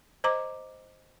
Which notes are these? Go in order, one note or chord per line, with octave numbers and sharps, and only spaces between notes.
C5 D#5 A#5 D6